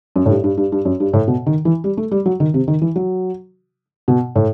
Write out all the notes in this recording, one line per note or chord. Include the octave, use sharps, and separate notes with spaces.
F#2
A2
G2
G2
G2
G2
F#2
G2
A2
B2
D#3
E3
G3
A3
G3
F#3
D#3
C3
D#3
E3
F#3
B2
A2